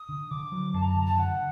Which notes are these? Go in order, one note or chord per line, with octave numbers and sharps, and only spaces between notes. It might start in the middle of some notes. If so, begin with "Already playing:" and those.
Already playing: D#6
D3
D3 D6
F#3
F#2 A5
A#5
A5
D3 A#5
A5
D3 F#5